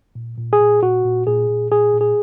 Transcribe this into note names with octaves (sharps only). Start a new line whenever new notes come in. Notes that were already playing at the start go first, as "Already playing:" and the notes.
A#2
A#2
G#4
A#2
A#2 F#4
A#2
A#2 G#4
A#2
A#2 G#4
A#2
G#4